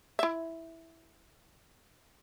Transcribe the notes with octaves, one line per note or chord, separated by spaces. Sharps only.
E4 E5